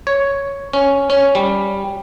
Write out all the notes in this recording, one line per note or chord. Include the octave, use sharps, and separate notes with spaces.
C#5
C#4
C#4
G3